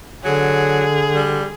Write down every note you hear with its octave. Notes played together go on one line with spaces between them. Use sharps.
D3 F#3 G#4
G3